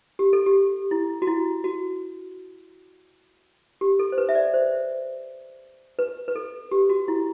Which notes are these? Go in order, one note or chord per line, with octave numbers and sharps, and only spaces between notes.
G4
A4
G4
E4
F#4
E4
F#4
G4
A4
C5
B4
E5
D5
C5
B4
B4
A4
G4
F#4
E4